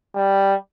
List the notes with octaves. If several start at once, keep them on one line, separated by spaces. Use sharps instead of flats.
G3